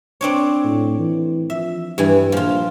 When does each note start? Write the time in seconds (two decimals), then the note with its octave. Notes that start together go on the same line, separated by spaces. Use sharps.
0.21 C4 D4 C#5
0.64 A2
0.99 E3
1.50 F3 E5
1.98 G2 E3 G3 G#5
2.32 A#1 F3 F4